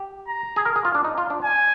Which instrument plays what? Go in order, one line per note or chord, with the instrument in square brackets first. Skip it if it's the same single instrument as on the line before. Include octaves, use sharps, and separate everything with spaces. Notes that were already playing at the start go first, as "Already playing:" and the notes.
Already playing: [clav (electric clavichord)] G4
[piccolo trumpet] A#5
[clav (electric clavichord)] G#4
A#4
G#4
F4
D4
D#4
F4
D4
[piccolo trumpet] G#5